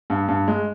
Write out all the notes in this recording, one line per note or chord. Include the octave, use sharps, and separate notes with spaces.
G2
G2
G#3